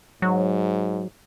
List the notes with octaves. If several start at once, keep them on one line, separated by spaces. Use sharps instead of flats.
G#2 F#3